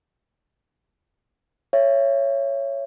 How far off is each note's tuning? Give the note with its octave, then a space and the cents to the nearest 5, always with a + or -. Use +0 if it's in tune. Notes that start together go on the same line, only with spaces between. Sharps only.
C#5 +0 E5 +30